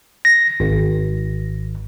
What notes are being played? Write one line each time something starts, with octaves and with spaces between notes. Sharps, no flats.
A#6
G#1